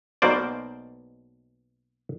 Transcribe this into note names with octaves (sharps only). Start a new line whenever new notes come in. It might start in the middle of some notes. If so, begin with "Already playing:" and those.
B1 B2 A#3 C5 D5